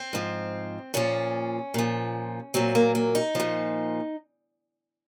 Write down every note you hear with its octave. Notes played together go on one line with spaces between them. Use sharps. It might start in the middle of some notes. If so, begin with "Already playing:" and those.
Already playing: C4
G#2 F3
A#2 F3 C#4
A#2 F3
A#2 F#3 C4
A#3
A#3
D#4
A#2 F3